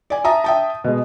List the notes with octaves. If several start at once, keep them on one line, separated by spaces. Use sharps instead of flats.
D5 G#5
E5 A5 A#5 D#6
E5 G5 A5
B2 G#3